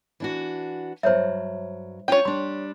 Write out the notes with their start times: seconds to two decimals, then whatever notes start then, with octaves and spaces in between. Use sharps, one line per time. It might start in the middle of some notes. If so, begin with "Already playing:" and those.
0.20 E3 D4 F#4
1.03 G2 F#3 C5 C#5 E5
2.08 C#4 D4 F4 C#5 G5
2.25 G3 D4 C6